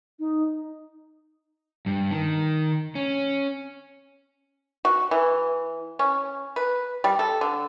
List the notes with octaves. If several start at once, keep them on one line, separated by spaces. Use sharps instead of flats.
D#4
G2
D#3
C#4
F#4
E3
C#4
B4
G3
A4
D3